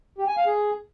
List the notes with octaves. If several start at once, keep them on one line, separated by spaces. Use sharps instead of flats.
G4
G#5
F5
G#4